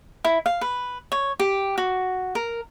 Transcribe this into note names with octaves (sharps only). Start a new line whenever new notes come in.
E4
F5
B4
C#5
G4
F#4
A#4